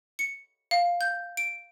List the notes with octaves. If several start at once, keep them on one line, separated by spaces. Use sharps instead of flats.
C#7
F5
G6
D7